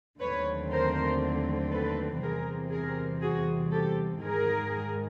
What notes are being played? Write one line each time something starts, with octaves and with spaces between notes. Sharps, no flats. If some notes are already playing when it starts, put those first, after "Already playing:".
D#2 D3 F#3 A3 C4 B4 C#5
A#4 C5
A4 B4
E2 C3 E3 G3 C4 G#4 A#4
G#4 A#4
F#4 G#4
G4 A4
G#2 D#3 G#3 G#4 A#4